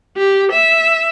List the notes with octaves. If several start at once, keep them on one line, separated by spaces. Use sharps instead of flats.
G4
E5